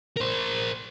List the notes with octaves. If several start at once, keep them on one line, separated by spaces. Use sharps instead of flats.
A#4 C5